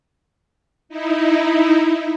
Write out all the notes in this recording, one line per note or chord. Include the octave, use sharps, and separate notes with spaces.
D#4 E4